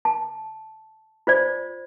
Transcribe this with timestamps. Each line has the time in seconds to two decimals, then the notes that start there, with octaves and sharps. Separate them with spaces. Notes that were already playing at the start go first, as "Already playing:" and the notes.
0.05 A5
1.27 F4 C5 D5